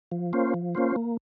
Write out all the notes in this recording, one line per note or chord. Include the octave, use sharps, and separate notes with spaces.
F3
A#3 C#4 F4 C5
F3
A#3 C#4 F4 C5
A#3